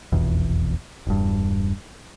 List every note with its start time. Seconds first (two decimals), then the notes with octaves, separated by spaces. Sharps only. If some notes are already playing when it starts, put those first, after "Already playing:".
0.12 F1 B1 E2
1.07 E1 G2